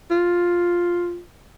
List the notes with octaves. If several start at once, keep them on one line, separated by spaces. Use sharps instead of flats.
F4